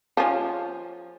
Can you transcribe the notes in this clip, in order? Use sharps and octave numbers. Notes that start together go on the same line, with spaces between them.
F3 C#4